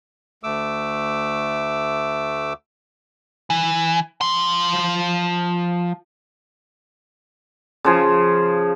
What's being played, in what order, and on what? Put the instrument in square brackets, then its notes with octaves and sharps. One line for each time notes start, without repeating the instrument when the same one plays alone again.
[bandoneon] D2 A3 D6 E6
[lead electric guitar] E3
F3 C6
[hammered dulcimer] C#3 F3 G#4